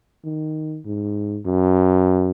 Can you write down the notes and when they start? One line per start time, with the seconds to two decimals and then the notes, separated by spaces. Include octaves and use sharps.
0.25 D#3
0.85 G#2
1.46 F#2